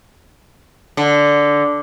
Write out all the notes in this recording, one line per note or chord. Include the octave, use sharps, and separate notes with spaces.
D3